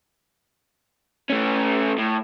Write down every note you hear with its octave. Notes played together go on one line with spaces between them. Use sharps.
A3 C#4
A2